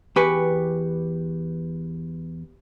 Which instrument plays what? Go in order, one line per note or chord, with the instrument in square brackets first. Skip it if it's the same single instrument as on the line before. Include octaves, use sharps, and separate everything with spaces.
[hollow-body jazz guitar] E2 G#5 [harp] G4 B4 C#6